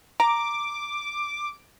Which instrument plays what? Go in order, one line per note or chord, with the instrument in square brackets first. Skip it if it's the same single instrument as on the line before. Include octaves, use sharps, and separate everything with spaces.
[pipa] A#5 [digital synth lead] D6